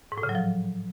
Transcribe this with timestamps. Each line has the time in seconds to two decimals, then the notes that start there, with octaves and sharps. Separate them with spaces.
0.12 G#2
0.18 A2
0.23 C#3
0.29 F#3
0.35 F3